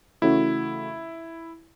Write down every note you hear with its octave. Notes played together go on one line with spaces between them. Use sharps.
C#3 E3 A3 C#4 E4 F#4